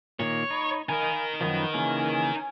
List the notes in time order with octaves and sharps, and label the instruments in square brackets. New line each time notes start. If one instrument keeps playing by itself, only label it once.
[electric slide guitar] A#2 D#3 A#3 [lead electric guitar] C#5
[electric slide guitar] D#4 [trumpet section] B5
[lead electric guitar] D#4 A#4 [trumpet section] D#5 F5 B5 [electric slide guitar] G#5
[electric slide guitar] F#2 D#3 F3 [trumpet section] B3
[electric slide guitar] C#3 E3 A#3 [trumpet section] C#4 G#5